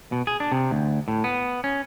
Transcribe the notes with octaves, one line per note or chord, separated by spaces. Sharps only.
B2
G#4
D4
C3
D2
A2
B3
C#4